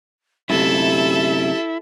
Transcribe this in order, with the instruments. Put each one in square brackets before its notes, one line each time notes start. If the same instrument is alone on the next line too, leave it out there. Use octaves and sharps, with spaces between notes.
[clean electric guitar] F#2 A2 C3 [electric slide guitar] E4 [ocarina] G4 [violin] A4 E5